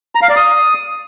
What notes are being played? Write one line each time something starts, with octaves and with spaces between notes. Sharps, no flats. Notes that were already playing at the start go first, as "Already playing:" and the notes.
A#5
F5
D5
D#6